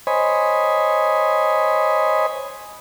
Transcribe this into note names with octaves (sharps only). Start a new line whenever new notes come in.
C5 C#5 D#5 G#5 B5